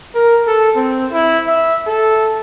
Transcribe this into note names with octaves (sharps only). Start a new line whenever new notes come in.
A#4
A4
C4
E4
E5
A4